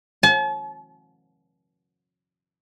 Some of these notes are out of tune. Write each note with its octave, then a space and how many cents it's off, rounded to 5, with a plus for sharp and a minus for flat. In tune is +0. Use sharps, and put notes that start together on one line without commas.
A5 -45